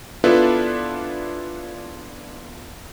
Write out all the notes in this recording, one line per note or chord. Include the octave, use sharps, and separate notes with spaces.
B3 D4 E4 F4 A4 B4